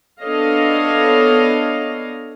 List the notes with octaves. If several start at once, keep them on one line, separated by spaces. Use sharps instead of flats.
B3 D4 A4 C#5 D#5 F5